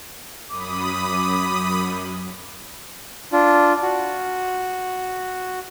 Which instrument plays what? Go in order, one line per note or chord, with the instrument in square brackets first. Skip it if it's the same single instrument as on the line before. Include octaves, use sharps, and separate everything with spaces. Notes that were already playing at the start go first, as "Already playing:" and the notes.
[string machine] F#2 [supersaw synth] B5 D#6 [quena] D6
[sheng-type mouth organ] D4 F4
F#4